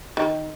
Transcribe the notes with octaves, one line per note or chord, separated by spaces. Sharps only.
D#3